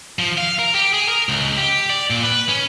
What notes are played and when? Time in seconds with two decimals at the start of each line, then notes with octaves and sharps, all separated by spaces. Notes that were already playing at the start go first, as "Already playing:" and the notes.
0.19 F3
0.38 F5
0.59 A#4
0.75 G4
0.94 G#4
1.08 A#4
1.29 C#2
1.57 G4
1.90 D5
2.10 A#2
2.23 B4
2.49 C#4